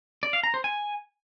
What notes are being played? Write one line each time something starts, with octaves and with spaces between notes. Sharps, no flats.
D5
F5
A#5
C5
G#5